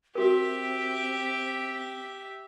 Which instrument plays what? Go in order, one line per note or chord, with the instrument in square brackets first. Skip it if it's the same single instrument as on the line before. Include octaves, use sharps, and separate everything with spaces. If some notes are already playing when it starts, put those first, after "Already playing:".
[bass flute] C4 [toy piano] F#4 A#4 [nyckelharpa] G4 E5